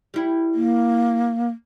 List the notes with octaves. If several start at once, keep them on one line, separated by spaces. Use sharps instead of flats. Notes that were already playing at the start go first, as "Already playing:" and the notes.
G3 E4
A#3